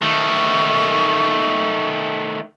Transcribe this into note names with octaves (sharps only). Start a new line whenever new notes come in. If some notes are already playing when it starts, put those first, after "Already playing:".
D#3 A3 C#6